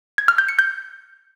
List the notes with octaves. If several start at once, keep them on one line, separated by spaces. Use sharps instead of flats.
G#6
F6
G6
C#7
G6